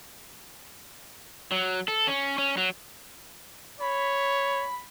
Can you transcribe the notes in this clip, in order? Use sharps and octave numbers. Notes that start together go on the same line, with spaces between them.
F#3
A4
C#4
C#4
F#3
C#5 B5